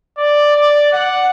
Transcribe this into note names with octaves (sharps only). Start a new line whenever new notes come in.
D5
D5
F#5